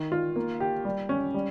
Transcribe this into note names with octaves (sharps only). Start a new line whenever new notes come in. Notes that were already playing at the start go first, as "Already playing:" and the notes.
Already playing: D#3
F4
A#3
G4
G3
C#4
G3